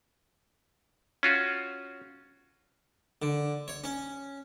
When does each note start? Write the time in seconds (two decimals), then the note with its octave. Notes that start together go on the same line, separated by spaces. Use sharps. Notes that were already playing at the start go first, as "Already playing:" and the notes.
1.23 C#4 F4 F#4
3.22 D3
3.68 C#5
3.84 C#4